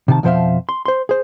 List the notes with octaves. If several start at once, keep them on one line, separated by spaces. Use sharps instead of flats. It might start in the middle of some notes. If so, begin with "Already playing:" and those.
C3 D#3 A5
F2 B2 F3 C5 E5 F5
C6
C5 C6
G#4 C5